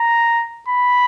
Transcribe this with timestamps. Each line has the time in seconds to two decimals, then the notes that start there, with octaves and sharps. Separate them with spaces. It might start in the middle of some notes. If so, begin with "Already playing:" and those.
Already playing: A#5
0.69 B5